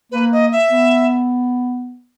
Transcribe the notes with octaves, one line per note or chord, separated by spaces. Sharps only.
A#3 B4
D#5
E5
B3